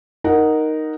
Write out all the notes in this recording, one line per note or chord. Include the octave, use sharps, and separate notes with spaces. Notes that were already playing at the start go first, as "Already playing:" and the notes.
D#4 A#4 F#5